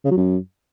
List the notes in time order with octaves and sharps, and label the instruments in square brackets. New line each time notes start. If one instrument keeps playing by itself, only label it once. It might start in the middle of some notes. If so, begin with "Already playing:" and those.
[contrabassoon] C#3
F#3
F#2